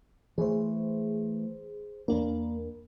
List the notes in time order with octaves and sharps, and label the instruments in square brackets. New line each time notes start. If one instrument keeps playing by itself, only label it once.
[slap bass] E3 A3 [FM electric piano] G#4 C5
[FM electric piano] E2 D4 A#4 [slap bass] A#3